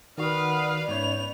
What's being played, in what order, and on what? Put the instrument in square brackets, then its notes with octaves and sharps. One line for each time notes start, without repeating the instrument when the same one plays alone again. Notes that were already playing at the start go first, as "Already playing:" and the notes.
[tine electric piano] D#3 F#4 [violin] B4 F5 [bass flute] D5 [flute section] F#5 D#6 F6
[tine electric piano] G#2 C#5 [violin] B3 F7 [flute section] C#4 E5 G6